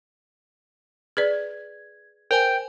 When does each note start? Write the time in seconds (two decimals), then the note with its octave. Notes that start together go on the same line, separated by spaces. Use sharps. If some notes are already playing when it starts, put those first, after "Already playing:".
1.17 G#4 B4 D5 G#6
2.31 A#4 C5 G5 G#5